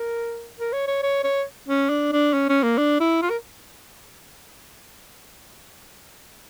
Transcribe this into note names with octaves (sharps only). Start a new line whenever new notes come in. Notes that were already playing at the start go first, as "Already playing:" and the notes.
Already playing: A#4
A#4
C#5
C#5
C#5
C#5
C#4
D4
D4
C#4
C#4
A#3
D4
E4
F4
A#4